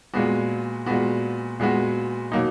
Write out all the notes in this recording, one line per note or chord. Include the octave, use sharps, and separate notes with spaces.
A#2 G#3 B3 F#4
A#2 G#3 B3 F#4
A#2 G#3 B3 F#4
B2 F#3 A#3 D#4